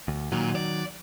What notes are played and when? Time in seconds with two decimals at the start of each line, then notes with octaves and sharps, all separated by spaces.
0.08 D2
0.32 A#2 D#3 F#3
0.55 D5